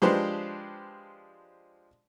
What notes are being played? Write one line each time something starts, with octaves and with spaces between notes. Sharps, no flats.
F3 G#3 D4 G4 B4 C5